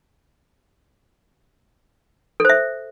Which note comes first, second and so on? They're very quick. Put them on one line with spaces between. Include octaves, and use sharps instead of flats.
A4 C5 E5